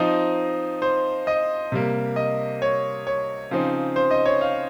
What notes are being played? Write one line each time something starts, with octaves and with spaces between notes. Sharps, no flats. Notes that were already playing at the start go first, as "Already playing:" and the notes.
Already playing: F3 C4 D#4 D#5
C5
D#5
C3 G3 A#3
D#5
C#5
C#5
C#3 F3 C4 D#4
C5
D#5
C#5
F5